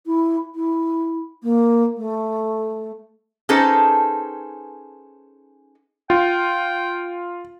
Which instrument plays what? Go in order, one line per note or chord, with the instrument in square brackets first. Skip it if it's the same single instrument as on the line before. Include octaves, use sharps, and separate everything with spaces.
[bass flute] E4
E4
A#3
A3
[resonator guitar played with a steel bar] C#4 D#4 G#4 A4 B4 C5
[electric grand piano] F4 [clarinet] G5